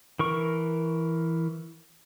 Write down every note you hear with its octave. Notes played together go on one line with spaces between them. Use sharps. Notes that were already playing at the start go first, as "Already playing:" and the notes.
E3 A#4 C#6